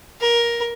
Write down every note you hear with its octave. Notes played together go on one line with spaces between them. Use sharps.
A#4